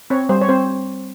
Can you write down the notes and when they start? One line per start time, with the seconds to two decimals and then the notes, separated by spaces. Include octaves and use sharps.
0.10 C4 C#5
0.29 G3 C5
0.42 C#5
0.49 C4 C5